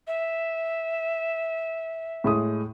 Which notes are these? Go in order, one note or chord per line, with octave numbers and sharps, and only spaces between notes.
E5
A2 G#3 D#6